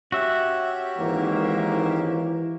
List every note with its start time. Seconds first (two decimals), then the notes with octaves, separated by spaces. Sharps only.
0.12 C#4 F#4 G4 E5
0.98 G#1 G#2 E3 A#3